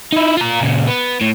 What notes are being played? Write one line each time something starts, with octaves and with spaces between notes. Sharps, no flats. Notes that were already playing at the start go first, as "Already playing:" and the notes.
D#4 E4
F4 A#5
A#2 C#3
B3
A2